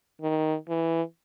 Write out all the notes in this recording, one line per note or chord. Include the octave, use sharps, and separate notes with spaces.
D#3
E3